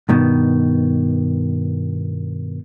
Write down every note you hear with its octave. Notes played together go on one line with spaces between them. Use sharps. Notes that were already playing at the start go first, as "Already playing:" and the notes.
G2 B2 D#3